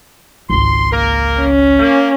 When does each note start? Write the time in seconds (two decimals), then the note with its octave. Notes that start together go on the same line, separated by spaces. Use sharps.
0.50 G#1 C#2 C6
0.92 A#3 A#4
1.41 C#4
1.79 A#3